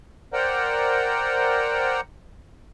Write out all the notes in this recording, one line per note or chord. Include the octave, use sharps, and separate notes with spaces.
A#4 C5 D5 F#5 G5 A#5